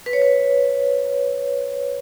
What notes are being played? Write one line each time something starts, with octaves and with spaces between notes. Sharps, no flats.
B4
C#5
B4